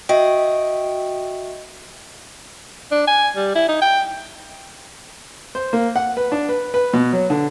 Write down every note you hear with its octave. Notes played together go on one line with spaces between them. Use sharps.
F#4 D#5 E5 G5
D4
G#5
G3
E4
D#4
G5
C5
A#3
F#5
B4
D4
B4
B4
B2
F#3
D3